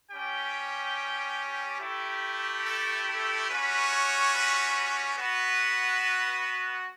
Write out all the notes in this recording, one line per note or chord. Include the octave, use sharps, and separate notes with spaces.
G3 C#4 G4 G5
A3 E4 G4
A4
A4
G3 C#4 F#4 B4
C#5
B4
B4
B3 F#4 B4